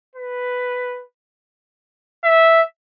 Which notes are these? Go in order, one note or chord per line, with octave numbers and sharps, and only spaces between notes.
B4
E5